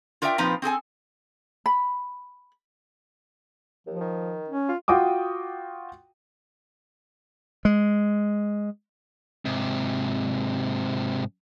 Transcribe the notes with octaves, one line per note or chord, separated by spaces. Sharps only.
F4 A#4 D5 E5 F#5 G5
A#2 F3 C4 D#4 B4 A#5
C4 G#4 A4 G#5
B5
D#2 F3
D#3
C#4
F4
F4 F#4 G5 D6 D#6
G#3
G#2 C3